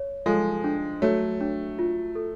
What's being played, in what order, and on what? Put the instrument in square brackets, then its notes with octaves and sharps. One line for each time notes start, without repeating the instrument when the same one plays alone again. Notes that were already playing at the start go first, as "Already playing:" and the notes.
Already playing: [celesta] C#5
[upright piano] F3 G#3 [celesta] A4
[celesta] D4
[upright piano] F#3 A3 [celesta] C#5
[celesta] D4
F4
A4